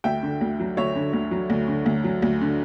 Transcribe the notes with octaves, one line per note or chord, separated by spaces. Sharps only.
D2 E5 G5
D3
D2
F#3
D2 C#5 E5
D3
D2
F#3
D2
D3
D2
F#3
D2
D3